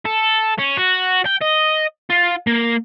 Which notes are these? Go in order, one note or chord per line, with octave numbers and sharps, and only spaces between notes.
A4
C#4
F#4
G5
D#5
F4
A#3